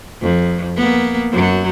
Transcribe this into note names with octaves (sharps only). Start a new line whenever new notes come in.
F2
A#3 B3
F#2 F#3